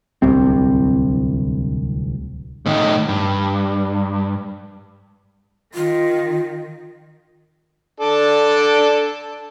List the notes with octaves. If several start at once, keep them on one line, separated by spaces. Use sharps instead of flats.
D1 C2 C3 C4
A2 D#3
G2
D#3 F4
D4 A4 D5